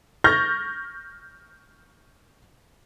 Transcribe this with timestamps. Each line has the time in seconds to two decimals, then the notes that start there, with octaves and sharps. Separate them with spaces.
0.24 C#6 F6 G6 A6 A#6